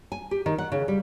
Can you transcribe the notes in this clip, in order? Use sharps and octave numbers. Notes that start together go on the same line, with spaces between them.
G#5
G4
D#3
F#5
C#3
G3